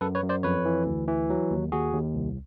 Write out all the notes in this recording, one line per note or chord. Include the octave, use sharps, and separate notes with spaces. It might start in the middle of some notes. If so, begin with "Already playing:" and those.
F#2 A4 B4
B4 C#5
F#2
C5 D5
F2 B4 C#5
E3
D2
E3
F#3
D#2
D#2 F#4 G#4
D#2
C2